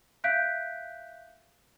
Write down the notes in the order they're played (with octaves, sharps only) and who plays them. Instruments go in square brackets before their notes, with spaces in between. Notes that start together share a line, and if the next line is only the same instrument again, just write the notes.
[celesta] E5 F5 F#6 G6 B6 D7